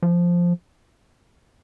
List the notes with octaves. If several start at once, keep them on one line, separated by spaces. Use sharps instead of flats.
F3